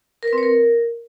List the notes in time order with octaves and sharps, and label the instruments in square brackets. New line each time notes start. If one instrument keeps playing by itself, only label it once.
[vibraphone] A#4
B4
C4
C#5
A#4